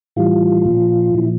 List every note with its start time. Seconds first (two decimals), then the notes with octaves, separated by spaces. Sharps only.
0.16 A2 E3 G3 F4
0.65 A#2 F3
1.15 A#2 F3 E4